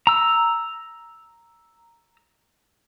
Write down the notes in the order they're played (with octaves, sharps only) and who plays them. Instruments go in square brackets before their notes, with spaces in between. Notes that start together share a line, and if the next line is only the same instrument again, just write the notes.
[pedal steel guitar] A#5 E6